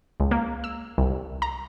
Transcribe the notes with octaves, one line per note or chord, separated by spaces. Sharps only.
C#2
A#3
E6
C2
A#5